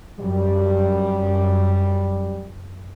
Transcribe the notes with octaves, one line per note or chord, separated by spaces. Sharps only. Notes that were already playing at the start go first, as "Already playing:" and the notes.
F#2 G3